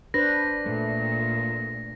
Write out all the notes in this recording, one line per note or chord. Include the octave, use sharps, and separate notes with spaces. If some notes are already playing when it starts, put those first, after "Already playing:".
D4 B4 C5 A#6
A#2 A3